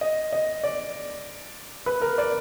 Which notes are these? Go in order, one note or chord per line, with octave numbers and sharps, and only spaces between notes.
D#5
D#5
D5
B4
A#4
D5